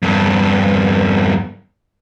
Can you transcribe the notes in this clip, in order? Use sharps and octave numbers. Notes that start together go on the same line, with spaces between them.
E2 G2